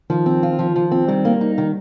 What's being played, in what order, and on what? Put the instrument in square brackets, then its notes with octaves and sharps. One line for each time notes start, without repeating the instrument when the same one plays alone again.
[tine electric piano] D#3 [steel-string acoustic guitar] F3
[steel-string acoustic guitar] C4
F4
F3
F3
C4
[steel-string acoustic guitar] D#3 [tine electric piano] G3
[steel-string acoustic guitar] A#3
D#4
D#3